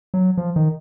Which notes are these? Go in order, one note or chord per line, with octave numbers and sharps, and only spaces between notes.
F#3
F3
D#3